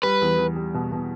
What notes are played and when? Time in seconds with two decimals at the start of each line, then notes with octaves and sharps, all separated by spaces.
0.03 G3 B4
0.22 E2
0.38 E2
0.56 G3
0.74 B2
0.92 B2